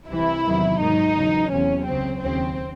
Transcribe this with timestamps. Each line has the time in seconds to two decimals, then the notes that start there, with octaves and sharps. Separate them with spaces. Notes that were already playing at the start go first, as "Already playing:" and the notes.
0.10 C2 C3 E3 E4
0.45 E2 C3 D#3 F#3
0.80 G#2 D#3 F#3 D#4
1.16 E2 C#3 F#3
1.52 E2 C3 F#3 C#4
1.87 C#2 C#3 F#3 C4
2.22 D#2 C#3 F#3 C4